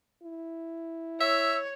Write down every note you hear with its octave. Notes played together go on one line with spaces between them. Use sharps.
E4
C#5 E5 E6